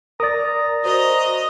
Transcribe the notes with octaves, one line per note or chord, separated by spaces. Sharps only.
A#4 D5 A#5 D#6 A6
F#4 C5 D#5 A#5